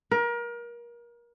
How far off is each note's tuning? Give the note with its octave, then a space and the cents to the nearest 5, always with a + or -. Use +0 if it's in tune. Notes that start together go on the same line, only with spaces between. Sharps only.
A#4 +30